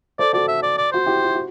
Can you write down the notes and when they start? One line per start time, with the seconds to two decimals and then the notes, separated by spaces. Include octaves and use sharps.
0.19 A4 C5 D5
0.33 F#4 A4 D5
0.48 E5
0.63 D5
0.78 D5
0.92 F#4 C5
1.06 E4 G4
1.24 E4
1.35 F#4